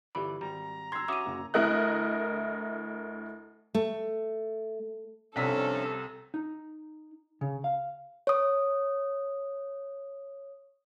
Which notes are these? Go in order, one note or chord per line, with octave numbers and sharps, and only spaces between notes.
G1 E3 G4 D5 B5
G#1 G3 A#5
C6 E6 G#6 C7
C#4 F#4 E5 D6 D#6 D#7
F#1
D2 E4 A#4 D#5 F#6
A3
C2 G2 C3 F3 C#4 A4 B6
D#4
C#3
F5
C#5 D#6